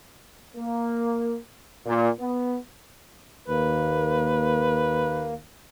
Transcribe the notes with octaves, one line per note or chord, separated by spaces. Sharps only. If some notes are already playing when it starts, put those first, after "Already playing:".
A#3
A#2
B3
D#2 A#3 B4